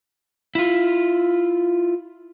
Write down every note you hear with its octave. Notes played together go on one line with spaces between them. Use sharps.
E4 F4